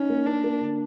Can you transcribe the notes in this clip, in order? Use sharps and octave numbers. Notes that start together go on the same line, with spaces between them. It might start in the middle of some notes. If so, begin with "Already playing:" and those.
Already playing: C#4 D#4
A#3
A#3 D4
A#3
D3